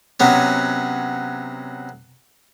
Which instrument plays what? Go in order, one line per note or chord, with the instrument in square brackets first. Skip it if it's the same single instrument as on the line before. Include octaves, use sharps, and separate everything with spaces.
[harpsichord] C3 F#3 B3 C#4